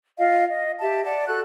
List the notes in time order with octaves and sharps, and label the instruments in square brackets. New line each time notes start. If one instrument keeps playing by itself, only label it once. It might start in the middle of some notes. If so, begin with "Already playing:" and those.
[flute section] F4 D#5 F5
D#5
G4 E5 A5
D5 F#5 A5
F#4 A4 F#6